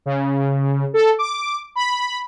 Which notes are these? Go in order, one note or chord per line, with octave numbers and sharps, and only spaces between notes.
C#3
A4
D6
B5